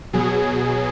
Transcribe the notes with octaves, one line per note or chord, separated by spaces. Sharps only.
B2 F#3 G#4